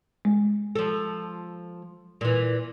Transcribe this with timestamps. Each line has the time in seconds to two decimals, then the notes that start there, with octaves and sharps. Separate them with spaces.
0.25 G#3
0.76 F3 A4
2.21 A#2 E3